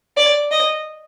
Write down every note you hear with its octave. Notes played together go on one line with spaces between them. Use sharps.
D5
D#5